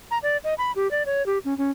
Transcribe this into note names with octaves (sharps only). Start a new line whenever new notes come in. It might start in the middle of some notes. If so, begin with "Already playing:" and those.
A#5
D5
D#5
B5
G4
D5
C#5
G4
C#4
C#4